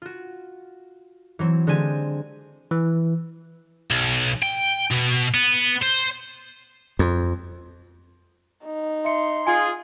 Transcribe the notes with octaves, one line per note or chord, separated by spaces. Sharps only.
F4 F#4
E3 F#3 C4
D3 G#3 C4 G4 G#5 D#7
E3
B1
G5
B2
B3
C5
F2
D#4
E5 C6 C#7
F4 G#4 G#5